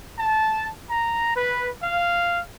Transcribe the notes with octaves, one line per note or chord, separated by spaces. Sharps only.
A5
A#5
B4
F5